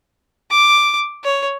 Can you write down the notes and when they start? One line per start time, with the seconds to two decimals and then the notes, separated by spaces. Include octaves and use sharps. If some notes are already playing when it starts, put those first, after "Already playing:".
0.51 D6
1.24 C#5